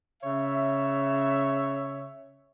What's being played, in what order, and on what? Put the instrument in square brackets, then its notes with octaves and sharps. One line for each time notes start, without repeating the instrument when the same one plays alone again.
[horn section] C#3 C#5 E5